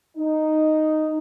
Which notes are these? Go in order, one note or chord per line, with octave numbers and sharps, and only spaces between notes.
D#4